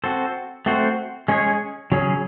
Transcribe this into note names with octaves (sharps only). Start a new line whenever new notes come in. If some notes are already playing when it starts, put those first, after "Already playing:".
C4 F#4 A4 C5
A3 C4 F#4 C5
G#3 C#4 G#4 C#5
C#3 F#3 C#4 G#4